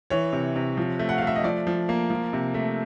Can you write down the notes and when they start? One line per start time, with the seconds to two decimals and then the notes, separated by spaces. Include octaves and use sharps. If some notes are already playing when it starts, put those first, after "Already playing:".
0.10 E3 C#5
0.33 C3
0.56 C3
0.77 F3
0.99 A3
1.09 F#5
1.18 F5
1.22 A3
1.27 E5
1.36 D#5
1.44 F3 D5
1.67 F3
1.89 A#3
2.10 F3
2.33 C3
2.54 A3